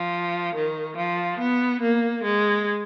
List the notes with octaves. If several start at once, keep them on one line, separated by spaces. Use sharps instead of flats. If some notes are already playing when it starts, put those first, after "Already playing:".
Already playing: F3
D#3
F3
B3
A#3
G#3